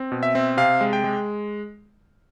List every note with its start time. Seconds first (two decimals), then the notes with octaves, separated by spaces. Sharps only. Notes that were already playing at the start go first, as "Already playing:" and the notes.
Already playing: C4
0.12 B2
0.23 E5
0.35 C4
0.57 C3 F5
0.81 G#3
0.93 G5
1.04 G#3